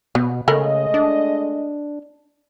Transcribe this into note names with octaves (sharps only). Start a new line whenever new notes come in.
B2 B3
C#3 G#3 A3 A4 A#4 D#5 B5
D4